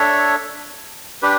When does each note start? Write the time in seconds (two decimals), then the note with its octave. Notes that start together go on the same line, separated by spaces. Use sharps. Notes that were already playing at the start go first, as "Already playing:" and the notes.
Already playing: D4 A4 C#5 E5
1.22 D4 G4 B4